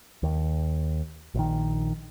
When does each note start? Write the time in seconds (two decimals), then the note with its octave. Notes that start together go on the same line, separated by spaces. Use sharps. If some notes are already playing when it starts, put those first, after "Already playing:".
0.23 D#2
1.34 A#1 D#3